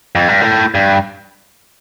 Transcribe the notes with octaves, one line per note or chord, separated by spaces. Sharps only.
F2
G2
A2
G2